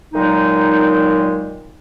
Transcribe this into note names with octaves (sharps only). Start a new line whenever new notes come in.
A#2 D#3 F#3 G#3 D#4